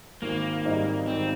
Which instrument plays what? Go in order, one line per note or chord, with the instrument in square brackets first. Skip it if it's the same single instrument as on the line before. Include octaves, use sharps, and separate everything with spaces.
[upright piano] G#1 [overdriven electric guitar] A#3
[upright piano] G#2 G3 C4 D#4
[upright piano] G#1 [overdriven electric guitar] C4